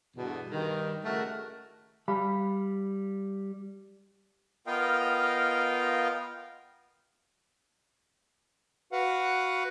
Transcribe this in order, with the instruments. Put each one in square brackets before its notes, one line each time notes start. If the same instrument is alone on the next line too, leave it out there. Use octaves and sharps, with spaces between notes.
[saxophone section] E2 G2 B2 D3
G2 D#3
A2 C#3 A3 F#4 A#4
[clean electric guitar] G3 F5 B5
[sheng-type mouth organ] B3 F4 A#4 D#5 F5 G5
[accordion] F#4 B4 F5 F#5